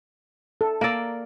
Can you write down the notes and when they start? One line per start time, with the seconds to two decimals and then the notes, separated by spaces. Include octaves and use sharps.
0.61 A4
0.81 A#3 D5 A#5 E6